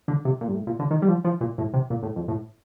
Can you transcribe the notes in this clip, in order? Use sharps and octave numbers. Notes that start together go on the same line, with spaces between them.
D3
C3
A#2
G2
A2
A#2
D3
D#3
G3
F3
F3
A#2
A2
C3
A#2
A2
F2
A2